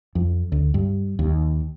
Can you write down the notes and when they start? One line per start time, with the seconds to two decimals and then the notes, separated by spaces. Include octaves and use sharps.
0.15 F2
0.52 D2
0.74 G2
1.19 D#2